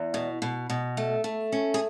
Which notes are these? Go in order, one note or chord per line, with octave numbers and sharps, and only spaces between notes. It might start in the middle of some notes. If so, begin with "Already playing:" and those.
Already playing: E2
B2
B2
B2
A3
A3
C#4
G#4